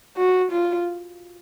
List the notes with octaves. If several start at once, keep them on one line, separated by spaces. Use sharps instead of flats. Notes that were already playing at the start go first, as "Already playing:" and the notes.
F#4
F4